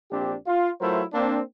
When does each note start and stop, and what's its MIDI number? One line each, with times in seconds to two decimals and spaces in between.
0.11 0.35 34
0.11 0.35 60
0.11 0.35 62
0.11 0.35 67
0.47 0.69 65
0.81 1.02 54
0.81 1.02 57
0.81 1.02 64
0.81 1.02 65
0.81 1.02 70
0.81 1.02 72
1.13 1.41 58
1.13 1.41 60
1.13 1.41 62